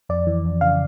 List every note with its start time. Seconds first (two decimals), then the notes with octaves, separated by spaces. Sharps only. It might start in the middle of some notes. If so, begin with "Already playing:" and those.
0.09 F2 D5
0.27 E3
0.45 F2
0.61 C#3 F5